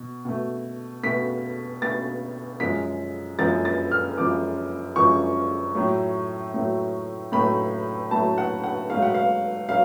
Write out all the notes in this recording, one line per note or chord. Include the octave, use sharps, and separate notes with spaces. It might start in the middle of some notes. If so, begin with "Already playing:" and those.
Already playing: B2
B2 A3
B2 A3 B6
B2 A3 A6
F#2 F3 G#3 B6
F#2 F3 G#3 A6
A6
F6
F#2 F3 G#3 D6
F#2 F3 G#3 C#6
A2 F#3 A3
A2 F#3 A3
A2 F#3 A3 B5
A2 F#3 A3 A5
F#5
F#5
G#2 F#3 A3 F5
F#5
F5
F#3 F5